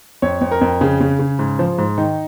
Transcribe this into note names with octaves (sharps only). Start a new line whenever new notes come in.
F2 C#5
F2
A#4
F2
C#3 G#4
C#3
C#3
G#2
F3
G#2
D#3 D#4